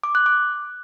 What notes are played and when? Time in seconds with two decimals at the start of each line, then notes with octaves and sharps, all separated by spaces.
0.04 D6
0.15 F#6
0.26 D6